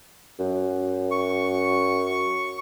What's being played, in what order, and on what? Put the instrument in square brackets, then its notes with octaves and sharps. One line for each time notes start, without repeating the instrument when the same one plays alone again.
[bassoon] F#2
[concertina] C#6